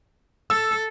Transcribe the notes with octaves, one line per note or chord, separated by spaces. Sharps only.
A4 E6